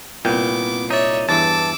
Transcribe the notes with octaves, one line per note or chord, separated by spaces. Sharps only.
C2 A#2 B3 G5 D6
D#4 C#5 D5 E5
E2 G2 E3 A5 D6 E6